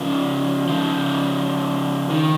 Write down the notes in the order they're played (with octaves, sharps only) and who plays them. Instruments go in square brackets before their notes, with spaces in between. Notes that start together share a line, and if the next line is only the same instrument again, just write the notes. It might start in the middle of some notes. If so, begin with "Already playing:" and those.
Already playing: [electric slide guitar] C#3 F3
C#3 F3
D#3